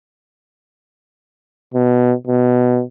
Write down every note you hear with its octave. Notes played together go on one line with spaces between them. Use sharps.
B2
B2